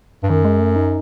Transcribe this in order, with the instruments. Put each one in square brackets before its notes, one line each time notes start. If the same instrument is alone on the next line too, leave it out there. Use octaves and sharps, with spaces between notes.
[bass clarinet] G2
[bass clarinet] F#2 [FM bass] D#3
[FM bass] G#3
A3
D#4